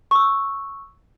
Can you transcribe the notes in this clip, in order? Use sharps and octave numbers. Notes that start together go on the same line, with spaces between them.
C#6 E6